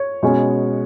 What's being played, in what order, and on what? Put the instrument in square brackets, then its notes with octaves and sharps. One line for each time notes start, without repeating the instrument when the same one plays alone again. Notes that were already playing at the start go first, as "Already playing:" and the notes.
Already playing: [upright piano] C#5
B2 G#3 C#4